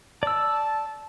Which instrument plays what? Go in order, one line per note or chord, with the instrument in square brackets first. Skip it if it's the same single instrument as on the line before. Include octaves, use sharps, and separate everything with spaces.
[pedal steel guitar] D5 E6 [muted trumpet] A5